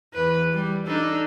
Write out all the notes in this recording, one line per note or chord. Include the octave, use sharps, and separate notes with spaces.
E2 B4
G3
D4 D#4 A4